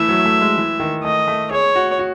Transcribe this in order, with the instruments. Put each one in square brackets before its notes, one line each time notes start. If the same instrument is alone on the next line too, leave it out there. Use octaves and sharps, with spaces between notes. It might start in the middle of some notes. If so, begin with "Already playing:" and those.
Already playing: [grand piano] E3 A3 [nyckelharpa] E5
[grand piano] F#3
A3
G#3
E3
D#3
[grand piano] A3 [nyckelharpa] D#5
[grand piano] A3
[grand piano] G#4 [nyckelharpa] C#5
[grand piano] F#4
F#4